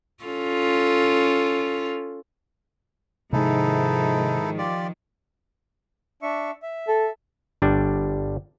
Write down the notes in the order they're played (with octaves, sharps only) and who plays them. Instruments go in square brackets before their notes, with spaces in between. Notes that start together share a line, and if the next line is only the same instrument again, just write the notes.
[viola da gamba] C#4 F4 A4
[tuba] G#2 [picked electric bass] C3 G#3 [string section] D#3 F3 [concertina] D#4 E4 A4
[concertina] F4 G4 D5
[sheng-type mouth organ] D4 E5 C#6
E5
[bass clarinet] A4
[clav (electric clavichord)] G1 G3 D4